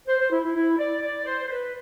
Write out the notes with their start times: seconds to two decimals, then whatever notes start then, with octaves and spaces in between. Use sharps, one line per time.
0.08 C5
0.20 C5
0.32 E4
0.44 E4
0.55 E4
0.79 D5
1.02 D5
1.26 C5
1.46 C5
1.50 B4